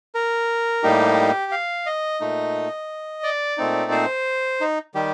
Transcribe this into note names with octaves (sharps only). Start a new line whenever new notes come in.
A#4
A2 G3 A#3 D#4 G4
F5
D#5
A#2 A3 D#4
D5
A#2 A3 C4 D#4
C5
D#4
D#3 G3 G4